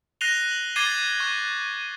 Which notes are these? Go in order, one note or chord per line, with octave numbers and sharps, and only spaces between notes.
F#6 A#6 C7 D#7 F7 G7
F#7
D6 G#6 A6 C7 D#7 G7
C#6 F#6